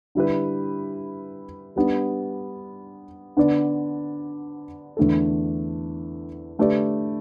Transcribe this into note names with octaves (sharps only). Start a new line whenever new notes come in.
D3 G3 E4 G4 B4
G3 B3 D4
D3 B3 D4 B4 D5
E2 D3 A3 D4 A4
D3 A3 G4 B4 D5